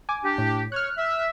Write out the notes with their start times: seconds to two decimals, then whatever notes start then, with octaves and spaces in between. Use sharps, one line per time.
0.09 G#5 D6
0.24 D4 G4
0.38 A2
0.72 C#5 F6 F#6
0.98 E5